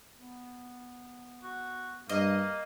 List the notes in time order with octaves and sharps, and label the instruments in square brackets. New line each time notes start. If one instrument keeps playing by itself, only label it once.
[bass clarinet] B3
[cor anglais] F#4
[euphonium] G2 [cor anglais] A#3 [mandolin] D#5